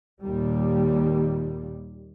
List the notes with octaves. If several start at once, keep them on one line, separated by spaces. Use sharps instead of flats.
D#2 A#2 G3